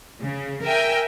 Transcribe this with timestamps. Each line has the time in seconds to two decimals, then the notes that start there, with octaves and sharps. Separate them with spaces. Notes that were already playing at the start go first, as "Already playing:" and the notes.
0.23 C#3
0.64 A#4 E5 G5 G#5